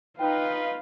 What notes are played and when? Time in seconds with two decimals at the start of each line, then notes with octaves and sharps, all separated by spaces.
0.19 D#4 F4 B4 F5 G5